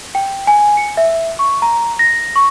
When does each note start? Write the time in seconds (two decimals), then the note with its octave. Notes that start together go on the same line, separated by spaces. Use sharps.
0.15 G5
0.47 G#5
0.77 C#7
0.97 E5
1.39 C#6
1.62 A#5
1.99 A#6
2.36 C#6